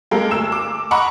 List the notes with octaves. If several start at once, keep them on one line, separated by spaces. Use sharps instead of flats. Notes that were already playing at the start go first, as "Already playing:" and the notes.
G#3 A#3 G4 A4 A#4
D2 E6 E7
D6
D#5 F#5 A#5 B5 C#6 D6